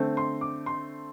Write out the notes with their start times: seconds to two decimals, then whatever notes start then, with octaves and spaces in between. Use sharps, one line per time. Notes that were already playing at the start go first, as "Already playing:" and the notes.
Already playing: D3 A3 C4
0.17 C6
0.41 D6
0.66 C6